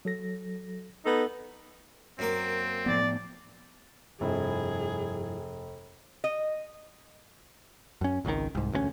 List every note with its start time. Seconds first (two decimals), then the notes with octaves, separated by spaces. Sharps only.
0.05 F#3 A4 A#6
1.05 B3 D#4 A4
2.19 F#2 A#3 C4 D6
2.86 A2 F3 B3 D5
4.21 F1 G2 F3 E4 G#4
6.24 D#5
8.01 F#2 C#4
8.25 G#1 C#2 C3 D#3
8.55 C2 G#2
8.72 E1 D2 G#3 C#4